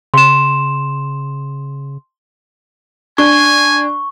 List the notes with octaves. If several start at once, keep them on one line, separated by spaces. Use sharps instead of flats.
C#3 C6 E7
D4 G#5 C#6